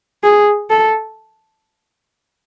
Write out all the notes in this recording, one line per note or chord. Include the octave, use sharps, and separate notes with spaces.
G#4
A4